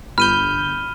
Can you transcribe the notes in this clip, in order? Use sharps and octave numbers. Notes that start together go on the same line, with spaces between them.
G1 B5 F6 G6 D#7 G7